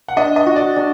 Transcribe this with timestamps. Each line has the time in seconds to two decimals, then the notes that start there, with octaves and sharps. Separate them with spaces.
0.08 F#5
0.17 D4 D#5
0.36 D#5
0.46 F#4
0.56 D5
0.76 D4